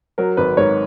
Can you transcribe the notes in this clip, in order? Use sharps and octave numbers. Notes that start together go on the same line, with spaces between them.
F#3 A#4
G#1 B4
G#2 A#4 C#5